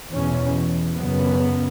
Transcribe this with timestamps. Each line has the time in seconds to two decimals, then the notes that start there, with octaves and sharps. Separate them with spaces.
0.11 E2 B2 C#4
0.97 F#2 C#3 B3